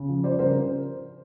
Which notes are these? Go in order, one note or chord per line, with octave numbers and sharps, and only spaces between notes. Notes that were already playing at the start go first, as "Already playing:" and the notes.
Already playing: C#3
F3
G3 C5 D5
C#3 A#4 C5
C#3